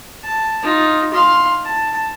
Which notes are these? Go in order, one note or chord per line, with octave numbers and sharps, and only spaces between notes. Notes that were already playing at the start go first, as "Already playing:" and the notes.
A5
D#4 F4
F5 C6
A5